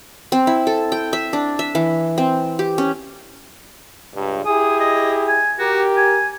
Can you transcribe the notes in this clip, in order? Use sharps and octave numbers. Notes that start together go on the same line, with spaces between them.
C4
E4
A4
G5
E5
D4
E5
E3
C4
G4
C#4
C#2 G2
E4 G4 G#4 D#6
D#5
G#5
F#4 G4 A#4
G#5